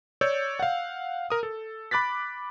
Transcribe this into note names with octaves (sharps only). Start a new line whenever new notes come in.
C#5 D5 E6 G6
F5 F#5
A#4 D#6
A4
B5 D6 F#6 A6 B6